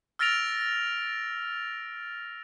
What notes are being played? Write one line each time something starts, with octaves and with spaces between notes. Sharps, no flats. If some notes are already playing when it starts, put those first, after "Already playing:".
E6 F6 A6 A#6 D7 F7